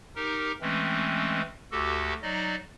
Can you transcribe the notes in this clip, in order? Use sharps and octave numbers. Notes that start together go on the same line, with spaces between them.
D#4 G4 A#4
E3 G#3 A3 C4 C#4
D2 F#4 G4 A4
F#3 D#4 D5 D#5